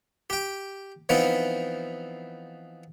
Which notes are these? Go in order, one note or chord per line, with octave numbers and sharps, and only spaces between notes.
G4 G5
E3 F3 B3 C4 D#4 F4